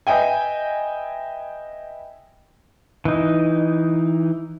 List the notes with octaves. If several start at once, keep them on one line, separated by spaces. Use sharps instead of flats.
B4 D#5 E5 G5 G#5
E3 D#4